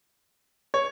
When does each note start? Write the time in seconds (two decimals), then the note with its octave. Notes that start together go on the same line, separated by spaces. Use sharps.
0.74 C#5